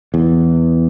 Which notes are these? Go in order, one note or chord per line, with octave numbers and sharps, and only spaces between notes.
E2